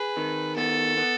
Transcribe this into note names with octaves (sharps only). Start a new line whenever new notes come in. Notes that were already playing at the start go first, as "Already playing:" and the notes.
Already playing: G#4 B4
D#3
B3 A4
B3